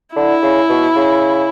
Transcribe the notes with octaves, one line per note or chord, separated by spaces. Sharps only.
D3 E4
C#3
B2
C#3